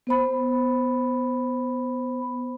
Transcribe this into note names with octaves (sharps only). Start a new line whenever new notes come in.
B3 C5 B5